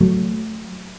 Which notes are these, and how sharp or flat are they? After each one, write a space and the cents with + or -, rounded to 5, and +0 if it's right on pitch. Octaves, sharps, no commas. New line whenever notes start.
F#3 +0 A3 +0